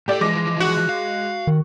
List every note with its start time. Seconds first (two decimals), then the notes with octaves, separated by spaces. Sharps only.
0.08 A2 G4 A4 D5
0.21 E3 F3 G#3 D6 A#6
0.60 F#4
0.89 F5
1.47 D#3